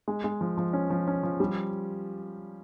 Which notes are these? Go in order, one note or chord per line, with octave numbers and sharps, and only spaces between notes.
G#3
G#3
F3
F3
C#4
F3
C#4
F3
G3